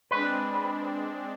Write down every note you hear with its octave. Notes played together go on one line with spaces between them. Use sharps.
G#3 C4 D4 B4